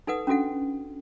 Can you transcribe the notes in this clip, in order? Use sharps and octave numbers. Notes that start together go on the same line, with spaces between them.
D#4 A4 B4 F#5 D#6
C#4 D4 F#4 A4 F#5